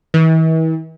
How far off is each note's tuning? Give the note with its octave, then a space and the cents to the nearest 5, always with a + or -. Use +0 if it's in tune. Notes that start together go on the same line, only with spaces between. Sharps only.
E3 -40